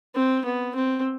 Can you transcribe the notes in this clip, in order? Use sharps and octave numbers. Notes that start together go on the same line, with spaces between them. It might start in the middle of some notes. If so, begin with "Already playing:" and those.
C4
B3
C4